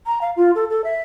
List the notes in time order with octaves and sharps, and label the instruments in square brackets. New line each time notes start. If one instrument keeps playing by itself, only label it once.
[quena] A#5
F5
F4
A4
A4
E5